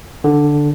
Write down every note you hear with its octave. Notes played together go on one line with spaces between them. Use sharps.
D3